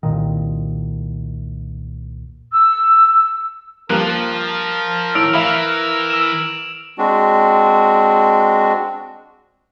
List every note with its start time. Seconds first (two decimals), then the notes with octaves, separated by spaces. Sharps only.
0.03 C2 F2 A#2 D#3
2.52 E6
3.90 G2 F3 A#3 A#4 F#6
5.15 A2 E6 D7 F7
5.34 E3 E5 F5 B5
6.10 E6 E7
6.98 G#3 C4 D4 F#4